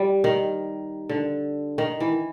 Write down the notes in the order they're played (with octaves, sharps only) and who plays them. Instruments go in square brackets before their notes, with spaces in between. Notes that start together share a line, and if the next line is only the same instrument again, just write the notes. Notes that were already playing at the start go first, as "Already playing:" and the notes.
Already playing: [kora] G3
D#3
D3
D#3
E3